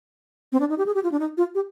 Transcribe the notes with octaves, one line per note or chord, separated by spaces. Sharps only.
C4
D4
D#4
G4
G#4
G4
F4
D4
D#4
F4
G4